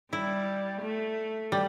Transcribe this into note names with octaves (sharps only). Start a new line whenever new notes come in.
G3 E4
A3
G3